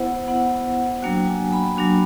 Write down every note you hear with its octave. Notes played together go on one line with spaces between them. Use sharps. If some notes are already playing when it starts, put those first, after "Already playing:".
Already playing: B3 E4 C5 F#5
B3 E4 F#5
F#3 A#3 D4 F#4 G5
G#5
B5
F#3 A#3 D4 F#4